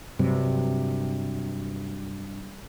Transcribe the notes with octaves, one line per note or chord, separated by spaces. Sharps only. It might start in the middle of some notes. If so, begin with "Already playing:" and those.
G2 C3 F#3